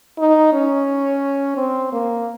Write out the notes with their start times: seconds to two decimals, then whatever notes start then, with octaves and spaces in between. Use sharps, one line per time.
0.18 D#4
0.53 C#4
1.57 C4
1.92 A#3